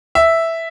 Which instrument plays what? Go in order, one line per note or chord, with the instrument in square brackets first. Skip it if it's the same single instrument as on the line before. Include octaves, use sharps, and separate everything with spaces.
[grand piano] E5